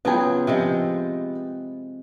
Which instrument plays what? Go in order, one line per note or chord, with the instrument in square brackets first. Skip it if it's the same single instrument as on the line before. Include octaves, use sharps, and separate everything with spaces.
[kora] C#3 F#3 G#4 [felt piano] B3 F4 G5
[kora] C3 F3 G#3